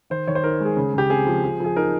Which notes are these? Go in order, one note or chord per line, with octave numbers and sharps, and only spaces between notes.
D#3 C5
D#3 C#5
C5
D#4 A#4
G#3 G#4
C#3
C#3 G4
C4 G#4
F3
F3
F3 G#4
D#4 A#4